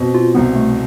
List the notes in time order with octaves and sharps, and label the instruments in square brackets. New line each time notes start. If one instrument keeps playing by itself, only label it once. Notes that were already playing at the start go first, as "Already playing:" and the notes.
Already playing: [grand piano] B2 C4
[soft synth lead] F4
[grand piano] C2 [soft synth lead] B3
[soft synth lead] A3